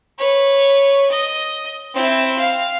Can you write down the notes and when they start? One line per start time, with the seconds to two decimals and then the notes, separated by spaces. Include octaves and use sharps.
0.19 B4 C#5
1.11 D#5
1.94 C4 E4
2.39 F5